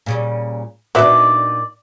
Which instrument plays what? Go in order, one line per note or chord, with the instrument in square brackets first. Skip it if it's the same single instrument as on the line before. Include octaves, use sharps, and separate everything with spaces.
[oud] A#2 C#3 G3
[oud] A#2 D#3 D4 [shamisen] B3 F#4 E5 [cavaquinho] D5